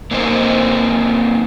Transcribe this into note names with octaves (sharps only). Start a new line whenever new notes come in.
A#3 C4 D#4 C5